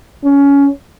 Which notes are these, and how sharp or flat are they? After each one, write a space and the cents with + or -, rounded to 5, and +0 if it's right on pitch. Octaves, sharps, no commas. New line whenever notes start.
C#4 +20